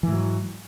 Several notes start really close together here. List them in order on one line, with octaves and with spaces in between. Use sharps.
E3 G#2 F#3